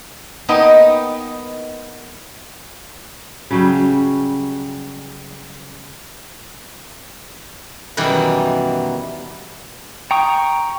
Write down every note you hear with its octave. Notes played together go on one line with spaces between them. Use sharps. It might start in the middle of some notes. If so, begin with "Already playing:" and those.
A#3 B3 D#4 B4 D#5 G5
C#3 F#3 G3
F#2 B2 D#3 E3 G3
G5 A#5 C#6 D#6